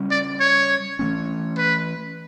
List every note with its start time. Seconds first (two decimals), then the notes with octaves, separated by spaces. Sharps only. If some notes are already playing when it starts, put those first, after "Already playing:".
Already playing: C#3 G3 C#4
0.11 D5
0.40 C#5
0.99 E3 A3 C#4
1.58 B4